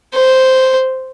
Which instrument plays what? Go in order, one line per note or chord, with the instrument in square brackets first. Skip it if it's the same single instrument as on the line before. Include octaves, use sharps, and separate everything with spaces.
[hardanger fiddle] C5